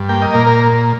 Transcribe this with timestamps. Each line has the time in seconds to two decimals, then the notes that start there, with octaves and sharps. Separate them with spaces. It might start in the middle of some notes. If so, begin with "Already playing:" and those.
Already playing: G2
0.09 A#3 G5
0.22 D#5
0.34 A#2 A#4
0.47 A#4